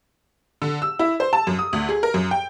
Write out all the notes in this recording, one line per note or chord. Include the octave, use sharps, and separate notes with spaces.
D3
E6
E4
C5
A5
F#2
D#6
D2
G#4
A#4
F#2
G5